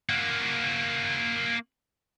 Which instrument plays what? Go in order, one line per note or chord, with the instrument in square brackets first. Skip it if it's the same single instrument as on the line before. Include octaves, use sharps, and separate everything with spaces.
[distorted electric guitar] A#3 F#4